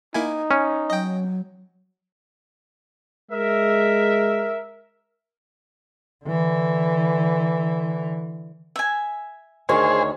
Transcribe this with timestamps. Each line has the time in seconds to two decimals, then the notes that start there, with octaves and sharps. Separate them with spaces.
0.14 A#3 D#4 E4 G#5
0.51 C#4
0.90 F#3 D#5 G5
3.31 G#3 A#4 E5
6.25 D3 E3
8.76 E5 G#5
9.69 D2 D#3 G#4 C5 C#5